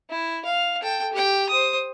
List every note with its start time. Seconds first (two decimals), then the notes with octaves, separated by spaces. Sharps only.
0.10 E4
0.45 F5
0.82 A4 G5
1.13 G4 G5
1.49 C5 D#6